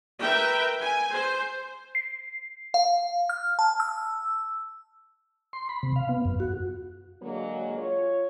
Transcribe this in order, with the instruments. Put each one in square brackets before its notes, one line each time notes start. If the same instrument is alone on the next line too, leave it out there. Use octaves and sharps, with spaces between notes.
[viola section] A#4 B4 E5 G5
G#5
C5
[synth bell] C7
F5
F6
A5
E6
[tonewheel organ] C6
B5
C3
F5
B3
F#2
F#4
[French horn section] D3 F#3 G#3 A#3
F4 C#5